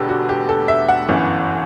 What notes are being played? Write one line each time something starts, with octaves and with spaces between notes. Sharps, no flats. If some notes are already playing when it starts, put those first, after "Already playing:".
Already playing: E1 E2 D3 G4 A4 B4
F#4
G4
A4
E5
F#5
G1 F#2 E3